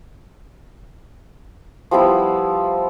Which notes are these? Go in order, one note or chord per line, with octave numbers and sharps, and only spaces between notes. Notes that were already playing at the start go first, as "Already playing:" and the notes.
F3 G3 B3 E4